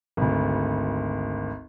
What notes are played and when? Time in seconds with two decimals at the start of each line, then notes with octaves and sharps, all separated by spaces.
0.17 G#1 D2